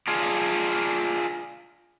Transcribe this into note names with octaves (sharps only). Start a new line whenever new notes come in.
D4 F4 G#4